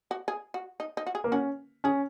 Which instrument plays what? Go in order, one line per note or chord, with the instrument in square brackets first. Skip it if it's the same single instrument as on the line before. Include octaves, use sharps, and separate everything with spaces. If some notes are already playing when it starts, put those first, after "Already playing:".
[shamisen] F#4
G#4
F#4
D#4
D#4
F#4
G#4
[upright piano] A#3
[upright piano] C#4 [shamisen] F#4
[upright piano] C#4 [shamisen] G#4